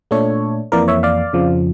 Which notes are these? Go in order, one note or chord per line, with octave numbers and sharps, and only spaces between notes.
A#2 A3 D4 A4 C#5
F2 E3 A#3 A#4 D5
C#5 E5
D5 F5
F2 C#3 F3